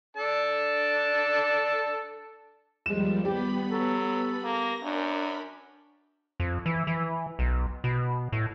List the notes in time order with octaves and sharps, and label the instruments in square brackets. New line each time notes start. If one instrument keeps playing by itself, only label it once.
[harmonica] D4 A4 A5
[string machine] D#2 F3 G3 [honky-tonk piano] G#3 E7
[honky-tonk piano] G3 [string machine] B3 B5 [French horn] G4
[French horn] F#3 [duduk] A4
[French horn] A#3 [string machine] A#6
[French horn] F#2 [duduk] D4 [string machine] A#4 B5
[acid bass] F2
E3
E3
B1
B2
A2